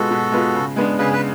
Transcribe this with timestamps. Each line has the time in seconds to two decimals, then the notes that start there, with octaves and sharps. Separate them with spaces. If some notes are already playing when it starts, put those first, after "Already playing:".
Already playing: B2 G#3 B3 F4 F#4 A4
0.11 B2
0.32 G#3 B3 F4
0.54 C#3
0.76 G#3 B3 D4
0.99 C#3 G#4 B4
1.13 B4